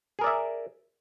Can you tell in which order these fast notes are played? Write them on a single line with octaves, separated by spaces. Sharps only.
G#4 A#4 D5 E5